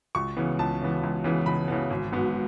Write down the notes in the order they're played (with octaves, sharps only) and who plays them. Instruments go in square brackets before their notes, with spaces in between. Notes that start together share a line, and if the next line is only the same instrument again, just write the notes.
[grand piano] C#2 C#6
C#3 E3 B3
C#2 A5
C#3 E3 B3
C#2
C#3 E3 B3
C#2 B5
C#3 E3 B3
G#1
G#2 F#3 B3